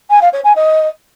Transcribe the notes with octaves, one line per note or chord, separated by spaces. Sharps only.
G#5
F5
C#5
G#5
D#5